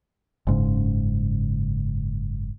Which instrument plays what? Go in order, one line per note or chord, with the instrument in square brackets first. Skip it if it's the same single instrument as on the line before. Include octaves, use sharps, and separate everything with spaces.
[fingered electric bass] F#1 G#2 C#3